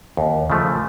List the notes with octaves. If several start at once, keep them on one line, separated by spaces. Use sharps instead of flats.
D#2
C#3 F3 A3